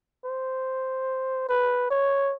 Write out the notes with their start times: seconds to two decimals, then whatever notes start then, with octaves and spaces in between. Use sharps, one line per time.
0.25 C5
1.49 B4
1.90 C#5